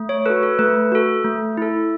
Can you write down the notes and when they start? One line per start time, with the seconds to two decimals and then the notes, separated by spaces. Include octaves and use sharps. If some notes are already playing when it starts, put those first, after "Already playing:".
Already playing: A3
0.09 C#5
0.26 F#4 A4 B4
0.43 A4
0.59 A3 B4
0.92 F#4 A4
1.24 A3
1.57 E4 A4